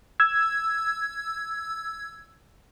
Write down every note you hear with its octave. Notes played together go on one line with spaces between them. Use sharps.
E6 G#6